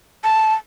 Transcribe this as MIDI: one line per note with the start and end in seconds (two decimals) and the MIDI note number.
0.24 0.54 81